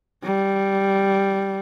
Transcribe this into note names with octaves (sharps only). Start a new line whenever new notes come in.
G3